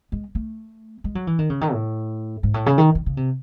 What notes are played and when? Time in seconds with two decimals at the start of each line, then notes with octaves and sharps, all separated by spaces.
0.12 G#3
0.35 A3
1.04 G#3
1.15 F#3
1.27 E3
1.39 D#3
1.50 C#3
1.61 D#3
1.73 A2
2.43 G#2
2.54 A2
2.66 C#3
2.78 D#3
2.95 D#3
3.06 C#3
3.17 C3